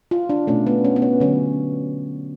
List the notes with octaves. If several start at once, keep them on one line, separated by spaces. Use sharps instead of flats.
F4
D4
B2 A3 C#4
B3
C#4
B3
C#4
D3 F#3 B3 C#4